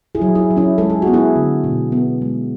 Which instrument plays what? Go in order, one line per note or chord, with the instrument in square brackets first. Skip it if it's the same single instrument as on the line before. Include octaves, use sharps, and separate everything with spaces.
[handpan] E4 G#4
F#3
E4 G#4
F#3
C#4 E4
G#3 A4
G#4
F#4
B3
E4 G#4
D3
B2
B3
G#3